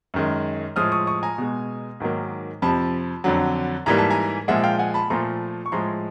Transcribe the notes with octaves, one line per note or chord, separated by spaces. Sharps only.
F#2 D#3 G#3
A2 F3 G#3 D#6 F6
C#6 D#6
C#6 D#6
G#5 A#5
B2 G#3
G#2 D#3 F#3 A#3
F2 C3 F3 A5 B5
F2 D3 F#3
G#2 E3 G3 A#3 A#5
A5
G#5 A#5
A#2 F3 G#3 E5 F#5
F5 G5
F#5 G#5
A5 B5
A#2 F3 A3 A#5 C6
C#6
A2 F3 G#3 A#5 C6